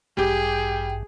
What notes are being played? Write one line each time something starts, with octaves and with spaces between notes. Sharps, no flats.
A1 G2 G3 G4 G#4 G5